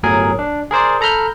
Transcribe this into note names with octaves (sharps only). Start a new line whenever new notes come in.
G1 A2 F#3 G#4 A#4 G#5
D4
G#4 A#4 C5 D5
A4 A#5 B5 F6 G6